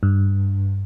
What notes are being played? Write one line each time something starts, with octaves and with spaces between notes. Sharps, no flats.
G2